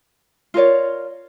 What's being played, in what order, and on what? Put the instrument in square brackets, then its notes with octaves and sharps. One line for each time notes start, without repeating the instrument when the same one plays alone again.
[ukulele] F4 A#4 C#5 D5